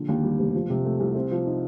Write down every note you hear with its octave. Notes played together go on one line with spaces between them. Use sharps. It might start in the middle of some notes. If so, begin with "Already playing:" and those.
Already playing: A#1 D3
D#2
G3
F1
F3
C3
A3
C2
C4
F3
D#4